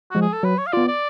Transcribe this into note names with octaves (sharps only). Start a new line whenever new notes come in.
F3 G#3 F#4
G#4
A4
F#3 B4
C#5
F5
B3 F4 D5
D5